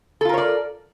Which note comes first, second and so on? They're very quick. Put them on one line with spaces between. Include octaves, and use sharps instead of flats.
A4 F4 A#4 C#5 D5